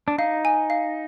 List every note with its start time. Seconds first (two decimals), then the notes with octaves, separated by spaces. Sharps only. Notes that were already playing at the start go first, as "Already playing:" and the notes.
0.08 D4
0.18 D#4 F5
0.45 G#5
0.70 F5